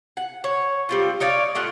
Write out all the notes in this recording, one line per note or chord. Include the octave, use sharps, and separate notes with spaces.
F#5
C#5
G3 C4 F4
D#4 C#5 D5 F5
A2 A3 F4 F#5